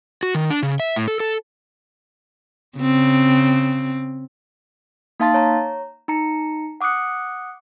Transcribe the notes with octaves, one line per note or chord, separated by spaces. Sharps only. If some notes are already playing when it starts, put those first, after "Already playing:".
F#4
D#3
D4
C#3
E5
A2
A4
A4
C#3 C4
A#3 D#4 F5 A5 C6 A6
C#5 A#5
D#4 A#5 C#7
F#5 D6 D#6 F#6 C#7